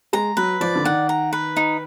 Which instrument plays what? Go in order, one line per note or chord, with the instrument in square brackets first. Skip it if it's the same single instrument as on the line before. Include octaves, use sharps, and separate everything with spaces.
[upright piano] G#3 [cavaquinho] A#5
[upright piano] F#3 [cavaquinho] B4
[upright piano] F3 [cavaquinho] D5
[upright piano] D3
[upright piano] D#3 [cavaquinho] F#5
[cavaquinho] A#5
B4
D#4